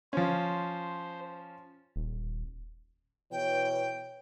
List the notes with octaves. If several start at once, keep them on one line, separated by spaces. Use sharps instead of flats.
F3 C#4 C5
D#1
B2 E3 C#5 G5